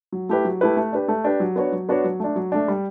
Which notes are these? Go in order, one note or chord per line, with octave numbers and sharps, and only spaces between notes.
F#3
A3 E4 G4 B4
F#3
A3 E4 G4 B4
A3
D4 G4 B4
A3
D4 G4 B4
F#3
B3 D4 F#4 C#5
F#3
B3 D4 F#4 C#5
F#3
A3 D4
F#3
A3 D4
G3